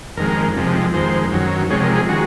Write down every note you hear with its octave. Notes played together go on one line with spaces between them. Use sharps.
F2 D#3 G#3 A#4
F2 C3 F3 G#3
F2 D#3 G#3 C5
F#2 D#3 F#3
C3 F3 G#3 C#5
A#4
G#4
D#3 G#3 F#4